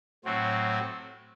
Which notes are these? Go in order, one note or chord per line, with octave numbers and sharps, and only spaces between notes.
A2 F#3 C4 F#4